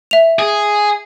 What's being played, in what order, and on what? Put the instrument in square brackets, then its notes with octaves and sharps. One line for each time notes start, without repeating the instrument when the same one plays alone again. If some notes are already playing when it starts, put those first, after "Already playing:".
[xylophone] E5 F7
[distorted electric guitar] G#4